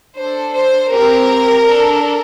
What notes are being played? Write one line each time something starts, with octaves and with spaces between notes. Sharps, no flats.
D4 A4 C5
C5
C4 G4 A#4
D4 A4